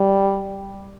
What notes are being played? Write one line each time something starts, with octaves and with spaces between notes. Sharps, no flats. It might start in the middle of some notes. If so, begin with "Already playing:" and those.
Already playing: G3